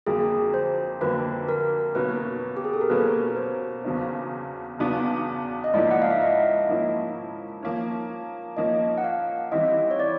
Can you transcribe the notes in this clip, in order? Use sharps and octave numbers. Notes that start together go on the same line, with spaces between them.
F2 D3 F#3 A#3 G#4
C5
F2 D3 F#3 A#3 B4
A#4
B2 F#3 A#3 C#4 B4
G4
G#4
A4
A#4
B2 F#3 A#3 C#4 B4
C5
E2 C#3 F#3 B3 D4
E2 C#3 F#3 B3 D4
D#5
G#2 F3 A#3 C#4 E4 D5
F#5
F5
E5
D#5
G#2 F3 A#3 C#4 E4
F3 A#3 C#4
F3 A#3 C#4 D#5
F#5
F5
E3 G3 C4 E4 D#5
C#5
D5